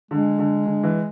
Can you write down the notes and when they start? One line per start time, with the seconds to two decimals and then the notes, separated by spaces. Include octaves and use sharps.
0.11 D3 G#3
0.39 D3
0.66 D3
0.84 E3